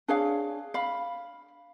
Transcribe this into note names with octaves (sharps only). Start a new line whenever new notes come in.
D4 G#4 C#5 F5
F5 B5